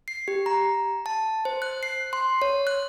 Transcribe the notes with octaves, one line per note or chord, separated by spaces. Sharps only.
C7
G4
A#5
A5
C5
F#6
C7
C6
C#5
F#6